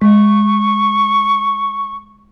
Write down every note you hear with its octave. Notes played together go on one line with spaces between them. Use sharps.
G#3 C#6